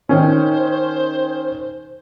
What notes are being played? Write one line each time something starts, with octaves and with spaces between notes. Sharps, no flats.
D#3 C#4 C5